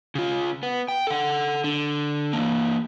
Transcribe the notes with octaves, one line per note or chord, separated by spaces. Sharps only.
C#3 F4
B3
G5
A4 F#5
D3
E3 A#3